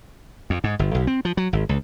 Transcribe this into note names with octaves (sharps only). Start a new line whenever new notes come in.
F2
G#2
G1
B1
C4
F3
F#3
G#1
C#2